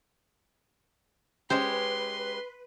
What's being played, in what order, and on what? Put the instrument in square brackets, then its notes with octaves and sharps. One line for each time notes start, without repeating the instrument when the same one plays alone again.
[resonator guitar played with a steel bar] G#3 C#4 G4 [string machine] B4 [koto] C5 [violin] C6